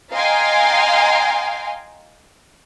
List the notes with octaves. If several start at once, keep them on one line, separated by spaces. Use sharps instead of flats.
D#5 F5 G5 G#5 A#5 C6